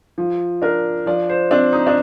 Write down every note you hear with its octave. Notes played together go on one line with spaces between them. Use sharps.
F3
D4 A#4
F3 D5
C5
C4 D4
D#4
D4